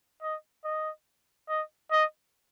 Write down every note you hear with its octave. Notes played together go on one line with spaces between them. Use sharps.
D#5
D#5
D#5
D#5